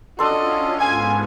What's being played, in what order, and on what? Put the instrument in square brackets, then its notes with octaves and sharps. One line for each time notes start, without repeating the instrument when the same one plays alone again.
[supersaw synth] C#4 F4 [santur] D4 A4 C6 [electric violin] F#4 D#5
[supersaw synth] G#2 B3 [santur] F5 [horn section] G#5 [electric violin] G#6